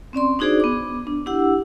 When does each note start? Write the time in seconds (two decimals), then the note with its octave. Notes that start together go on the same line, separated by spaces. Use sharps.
0.13 C4 C#4 D5 C6
0.39 D4 D#4 F#4 G#4 C5 D5
0.60 B3 D6
1.07 D4
1.26 D4 E4 G4 F#5 E6